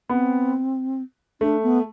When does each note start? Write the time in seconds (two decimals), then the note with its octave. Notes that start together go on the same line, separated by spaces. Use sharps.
0.10 B3 C4
1.41 A3 D4
1.63 B3